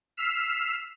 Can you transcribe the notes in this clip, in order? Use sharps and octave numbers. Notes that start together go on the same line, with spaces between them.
E6 F6 B6 C7